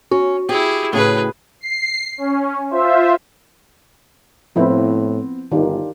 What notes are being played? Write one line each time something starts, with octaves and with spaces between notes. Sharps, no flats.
C#4 F#4
E4 G4 G#4
A2 C#3 G#4 B4
C7
C#4
F4 C5 E5
A2 F3 B3 C4 E4
G1 D#3 D4 F4 G4